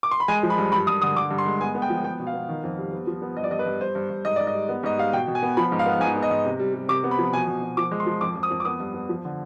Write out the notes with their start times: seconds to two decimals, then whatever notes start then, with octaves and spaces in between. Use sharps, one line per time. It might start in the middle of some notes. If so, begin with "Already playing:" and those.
0.03 D6
0.11 C6
0.20 B5
0.28 G#3 G#5
0.43 F3
0.50 B5
0.58 G2
0.72 G2 B5
0.87 G2 D#6
1.02 D3 D#6
1.16 D3 D6
1.31 G2
1.38 C6
1.46 G#3
1.61 B3 G#5
1.75 B3
1.82 G5
1.90 F3
2.04 B3 G5
2.19 B2
2.27 F5
2.34 B3
2.49 D#3
2.63 F2
2.78 G3
2.92 B3
3.07 F3
3.22 B3
3.36 G2 D#5
3.44 D5
3.51 G2 D#5
3.59 B4
3.66 G2
3.81 G2 C5
3.95 G2
4.10 G2
4.25 G#2 D#5
4.36 G#2 D5
4.47 D#5
4.54 G3
4.69 B3
4.83 G#2 D#5
4.98 G3 F5
5.13 B2 G5
5.28 B2
5.35 G#5
5.43 B3
5.57 F3 B5
5.72 G#2
5.79 F5
5.86 B3
6.00 G#2 G#5
6.16 B3
6.23 D#5
6.31 G#2
6.45 C3
6.59 G3
6.74 G3
6.89 C3 D6
7.04 B3
7.11 B5
7.18 F3
7.33 B2 G#5
7.48 B2
7.62 B2
7.77 F3 D6
7.91 G#3
8.00 C6
8.06 F3
8.21 F2 D6
8.36 F2
8.43 D#6
8.51 F2
8.60 D6
8.65 B3 D#6
8.80 G2
8.94 B3
9.09 F3
9.25 D3